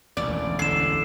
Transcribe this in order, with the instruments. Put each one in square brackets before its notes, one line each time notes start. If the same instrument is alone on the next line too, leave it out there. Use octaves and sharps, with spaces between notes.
[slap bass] E1 A1 D2 [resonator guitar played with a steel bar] D5
[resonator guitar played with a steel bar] D3 [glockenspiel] C7 E7